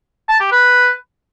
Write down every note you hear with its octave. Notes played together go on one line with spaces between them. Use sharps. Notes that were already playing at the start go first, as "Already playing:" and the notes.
A5
G4
B4